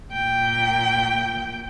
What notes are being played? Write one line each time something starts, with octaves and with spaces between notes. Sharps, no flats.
A#2 G5